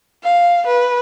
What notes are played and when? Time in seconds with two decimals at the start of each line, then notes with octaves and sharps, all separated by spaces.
0.24 F5
0.66 B4